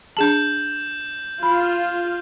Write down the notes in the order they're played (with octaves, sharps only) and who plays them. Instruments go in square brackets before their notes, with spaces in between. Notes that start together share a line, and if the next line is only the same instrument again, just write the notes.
[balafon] D4 G#4 A5 [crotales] G6 E7 F#7
[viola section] F4 [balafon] B5